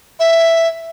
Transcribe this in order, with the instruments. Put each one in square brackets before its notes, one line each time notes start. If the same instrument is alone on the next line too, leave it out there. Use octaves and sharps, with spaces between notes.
[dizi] E5